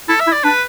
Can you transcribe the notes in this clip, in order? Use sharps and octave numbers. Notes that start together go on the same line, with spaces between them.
E4 A4
E5
E4
D5
D4 B4